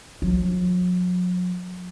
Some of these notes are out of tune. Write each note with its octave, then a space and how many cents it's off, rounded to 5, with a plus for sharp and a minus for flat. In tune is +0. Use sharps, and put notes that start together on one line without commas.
F#3 -45